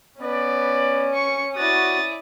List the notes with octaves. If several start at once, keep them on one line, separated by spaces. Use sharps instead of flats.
B3 C#4 B4 D5
C#6 C#7
E4 F#4 D5 D#6 A6